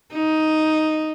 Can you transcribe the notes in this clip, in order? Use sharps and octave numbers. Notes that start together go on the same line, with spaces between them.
D#4